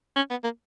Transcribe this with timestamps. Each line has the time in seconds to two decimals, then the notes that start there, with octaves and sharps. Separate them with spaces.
0.16 C#4
0.30 B3
0.44 A#3